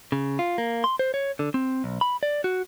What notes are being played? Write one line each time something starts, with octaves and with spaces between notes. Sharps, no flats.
C#3
F4
A#3
C6
C5
C#5
D3
C4
B1
B5
D5
F#4